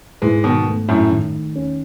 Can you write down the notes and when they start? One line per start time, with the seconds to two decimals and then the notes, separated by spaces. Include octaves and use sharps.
0.22 G#2 E3 G#3
0.44 B2 D#3
0.67 A3
0.88 F#2 A2
1.11 D#3
1.56 C#4